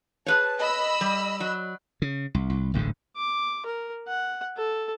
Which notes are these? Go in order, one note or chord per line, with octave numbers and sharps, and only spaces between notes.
G#4 B4 C#5 A5
D#5 B5 E6
G3
F#3
C#3
C2
C2
D1 A1 G#2 D3
D6
A#4
F#5
A4